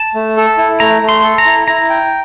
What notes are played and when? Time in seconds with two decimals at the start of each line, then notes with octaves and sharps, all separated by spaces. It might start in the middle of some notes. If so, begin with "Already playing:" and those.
Already playing: A5
0.14 A3
0.37 A4
0.57 E4
0.80 A3 A#5
1.02 A3
1.09 C6
1.23 A4
1.38 A#5
1.45 E4
1.68 E4 A#5
1.90 G5